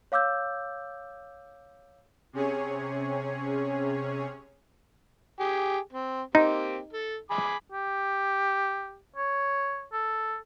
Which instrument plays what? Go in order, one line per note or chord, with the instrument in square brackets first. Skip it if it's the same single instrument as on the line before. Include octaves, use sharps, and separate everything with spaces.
[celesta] C#5 F5 D6 E6 G6
[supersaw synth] C3 C#4 G#4 C#5
[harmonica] G4 G#4
C4
[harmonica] A#3 C4 G4 [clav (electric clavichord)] D#4
[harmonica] A4
G#4 B5 D6
[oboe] G4
C#5
A4